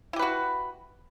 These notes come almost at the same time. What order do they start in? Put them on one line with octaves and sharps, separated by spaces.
E4 G4 B4 F#4